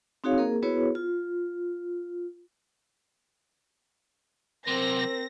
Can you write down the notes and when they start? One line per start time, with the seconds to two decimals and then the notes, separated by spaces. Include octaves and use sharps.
0.24 C4 D#4 F#4 G#4 C#5 F5
0.38 A#3 G#4 A#4
0.62 B3 E4 F#4 G#4 B4 C#5
0.95 F4
4.67 C3 F#3 C4 A#4 A#6